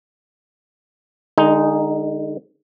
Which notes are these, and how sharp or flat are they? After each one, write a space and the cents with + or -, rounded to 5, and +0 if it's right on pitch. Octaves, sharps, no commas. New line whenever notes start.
D3 +30 G#3 -20 D#4 +0